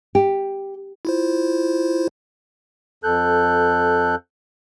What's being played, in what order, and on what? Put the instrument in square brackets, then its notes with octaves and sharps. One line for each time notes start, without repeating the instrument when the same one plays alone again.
[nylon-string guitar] G4
[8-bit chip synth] E4 F4 C5
[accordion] F2 A4 F#6 G6